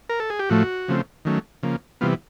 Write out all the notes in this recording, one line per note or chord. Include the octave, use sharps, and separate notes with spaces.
A#4
A4
G#4
G4
A2 F3 A3 F#4
C#3 F3 A3 C4
D#3 F#3 A3 C#4
C#3 F3 A#3
C3 E3 G3 B3 F4